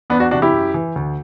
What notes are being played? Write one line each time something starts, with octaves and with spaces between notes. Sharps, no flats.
E2 B3 D4
D4 F#4
C3 E3 D4 F#4
E4 G4
F#2
E3
D2